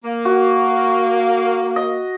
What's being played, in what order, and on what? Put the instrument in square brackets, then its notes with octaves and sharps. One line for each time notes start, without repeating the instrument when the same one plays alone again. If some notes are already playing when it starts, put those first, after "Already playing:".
[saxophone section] A#3
[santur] F#4
D#5